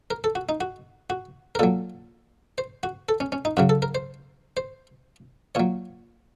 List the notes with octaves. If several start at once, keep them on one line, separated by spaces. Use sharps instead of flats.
A#4
A4
F#4
D#4
F#4
F#4
A#4
A#2 F#3 A4
C5
F#4
A4
C#4
C#4
D#4
F#2 C#3 F#3 F#4
A4
A#4
C5
C5
A#2 F#3 C#5